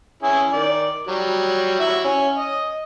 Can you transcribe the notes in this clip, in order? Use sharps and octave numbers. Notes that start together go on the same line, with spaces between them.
C#4 E4 G#4
D#3 D5
F#3 G3
E4 F#4 E5
C#4
D#5